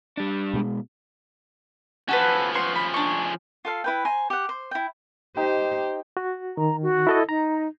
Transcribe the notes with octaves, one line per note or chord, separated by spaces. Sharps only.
G3 D4
B2 G#3
F3 C#4 F#4 A4 B4
B3 C6 C#6
B5
D4 C#6
F4 A4 F5
E4 B4 G5
C5 G#5 A#5
G4 F#5
C5
E4 G5
D#4 G4 C5 G5
F#4
D#3 A#5
F#4
E4 A4 D#5
D#4 A#5